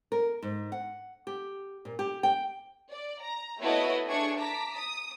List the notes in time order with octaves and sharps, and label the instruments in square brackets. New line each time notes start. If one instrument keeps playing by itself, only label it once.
[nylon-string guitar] A#4
G#2
F#5
G4
A#2
G4
G5
[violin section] D5
A#5
A3 B3 E4 F#4 C#5 D#5
A3 D4 G#4 C#6 G#6
A5 A#5 D6 B6
D#6